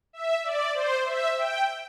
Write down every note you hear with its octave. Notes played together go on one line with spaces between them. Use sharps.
E5
D5
C5
E5
G5